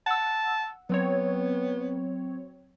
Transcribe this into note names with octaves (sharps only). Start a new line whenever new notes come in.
F#5 A5 E6
F#3 B3 C4 C#5